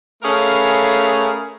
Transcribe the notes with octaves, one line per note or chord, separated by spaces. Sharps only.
A3 C#4 G#4 A#4 B4 F5